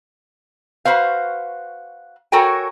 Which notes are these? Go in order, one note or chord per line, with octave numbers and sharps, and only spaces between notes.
F#4 B4 C5 F5
F#4 A4 A#4 C#5 G5 G#5